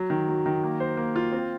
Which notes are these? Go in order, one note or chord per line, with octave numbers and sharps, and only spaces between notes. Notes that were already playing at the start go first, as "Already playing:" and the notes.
Already playing: F#3
D#3
F#3
D#3
A#3
C5
A#3
F4
C4